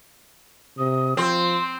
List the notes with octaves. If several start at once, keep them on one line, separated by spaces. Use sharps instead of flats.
C3 D#6
F3 C4 C6